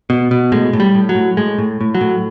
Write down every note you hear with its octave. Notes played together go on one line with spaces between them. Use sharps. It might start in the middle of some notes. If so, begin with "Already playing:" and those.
B2
B2
A2 G#3
A2
G3
A2
F#3
A2
A2 G#3
A2
A2
F#3
A2